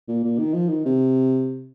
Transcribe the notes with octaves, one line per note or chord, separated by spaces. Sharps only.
A#2
A#2
D#3
F3
D#3
C3